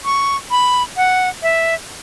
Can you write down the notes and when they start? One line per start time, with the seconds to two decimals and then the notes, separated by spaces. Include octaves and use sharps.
0.05 C#6
0.51 B5
0.97 F#5
1.42 E5